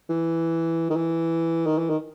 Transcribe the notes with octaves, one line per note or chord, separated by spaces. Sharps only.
E3
D#3
E3
D#3
E3
D#3